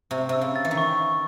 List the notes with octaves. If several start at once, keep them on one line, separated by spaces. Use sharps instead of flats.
C3 C#6
C3 E6
C#3
A6
E3
D#3
C#6